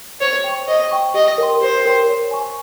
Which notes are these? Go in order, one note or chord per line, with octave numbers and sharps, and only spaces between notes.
C5 C#5
G5
C#6
C5 D#5
G5 C#6
G4 D#5
A#4 C#5 G5 C6
G4 C5
A#4 C#5 G5 C6
C#5
G#5 C#6